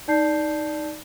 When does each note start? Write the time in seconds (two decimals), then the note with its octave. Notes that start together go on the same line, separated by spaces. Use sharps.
0.08 D#4 D5 A5 G6 C7